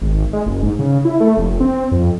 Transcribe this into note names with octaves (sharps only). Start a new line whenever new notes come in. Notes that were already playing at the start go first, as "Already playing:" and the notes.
G#1
G#3
F#1
G#2
C#3
E4
A3
F1
C4
F2